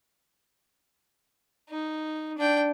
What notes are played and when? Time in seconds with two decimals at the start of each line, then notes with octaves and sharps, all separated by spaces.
1.70 D#4
2.38 D4 G5